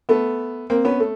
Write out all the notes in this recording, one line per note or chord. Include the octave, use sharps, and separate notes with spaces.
A3 B3
A#3 C4
B3 C#4
A3